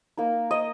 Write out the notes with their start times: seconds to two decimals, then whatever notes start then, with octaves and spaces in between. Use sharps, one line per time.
0.17 A#3 D#4
0.51 D#5